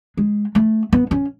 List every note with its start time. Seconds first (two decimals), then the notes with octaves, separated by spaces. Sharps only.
0.17 G#3
0.55 A3
0.93 B3
1.11 C#4